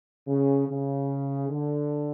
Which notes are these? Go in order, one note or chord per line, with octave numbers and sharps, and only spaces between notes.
C#3
C#3
D3